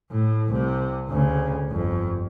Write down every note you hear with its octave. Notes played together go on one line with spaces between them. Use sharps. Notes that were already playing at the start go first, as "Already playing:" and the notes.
A2
C2 C3
D2 C#3
G1 F2